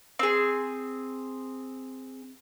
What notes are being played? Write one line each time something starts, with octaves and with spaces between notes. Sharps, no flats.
C4 G#4